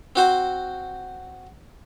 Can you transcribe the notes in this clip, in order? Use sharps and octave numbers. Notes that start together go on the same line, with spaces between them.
C4 F#4 C5